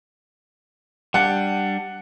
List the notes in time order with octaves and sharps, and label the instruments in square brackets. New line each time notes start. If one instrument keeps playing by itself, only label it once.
[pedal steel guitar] G3 D4 [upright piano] F#5